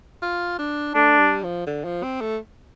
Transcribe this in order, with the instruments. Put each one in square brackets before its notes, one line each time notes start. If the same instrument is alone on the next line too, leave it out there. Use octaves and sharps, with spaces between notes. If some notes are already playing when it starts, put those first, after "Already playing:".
[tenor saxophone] F4
D4
[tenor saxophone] A3 [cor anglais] D4
[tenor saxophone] G3
F3
D3
F3
C4
A3